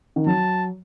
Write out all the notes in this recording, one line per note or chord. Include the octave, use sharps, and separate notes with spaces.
D#3
F#3 A5